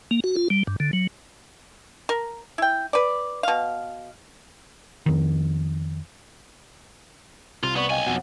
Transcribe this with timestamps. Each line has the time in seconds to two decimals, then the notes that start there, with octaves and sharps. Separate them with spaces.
0.11 A#3
0.24 F#4
0.36 F4
0.50 G3
0.67 G2
0.80 D3
0.93 F#3
2.09 A#4
2.58 E4 G5
2.93 B4 D5
3.43 B2 F5
5.06 F2 D#3
7.63 C2 C3 F4
7.76 B3 D5 C#6 F#7
7.90 B1 D#5 F5 G5 G#5
8.07 F2 B2 F#5